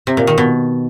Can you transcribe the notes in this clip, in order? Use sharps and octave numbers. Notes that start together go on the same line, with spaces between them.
C3
A#2
D#3
B2